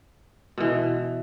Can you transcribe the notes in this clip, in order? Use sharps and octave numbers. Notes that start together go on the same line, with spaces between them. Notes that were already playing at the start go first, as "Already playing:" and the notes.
B2 E3